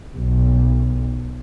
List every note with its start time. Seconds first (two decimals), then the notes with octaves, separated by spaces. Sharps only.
0.17 B1